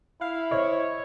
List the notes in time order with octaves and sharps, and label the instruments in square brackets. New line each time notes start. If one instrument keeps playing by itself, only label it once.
[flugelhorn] E4 [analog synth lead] F5
[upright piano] C5 D#5 [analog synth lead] C#5